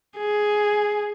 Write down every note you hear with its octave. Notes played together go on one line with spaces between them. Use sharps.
G#4